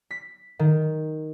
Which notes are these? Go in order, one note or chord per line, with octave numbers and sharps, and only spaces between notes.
B6
D#3